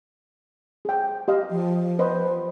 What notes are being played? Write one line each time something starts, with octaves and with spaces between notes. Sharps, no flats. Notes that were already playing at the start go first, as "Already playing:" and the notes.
G#4 G5
G4 D#5 F5
F3
B4 C5 D#5